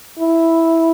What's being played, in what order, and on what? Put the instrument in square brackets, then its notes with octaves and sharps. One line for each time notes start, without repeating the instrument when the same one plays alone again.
[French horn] E4